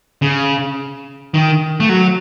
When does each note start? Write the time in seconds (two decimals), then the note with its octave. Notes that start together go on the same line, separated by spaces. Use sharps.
0.22 C#3
1.34 D#3
1.80 A3
1.89 F#3